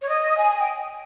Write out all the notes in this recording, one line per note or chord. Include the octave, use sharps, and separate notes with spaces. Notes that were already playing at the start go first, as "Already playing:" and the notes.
C#5
D#5
G#5
G#5
G5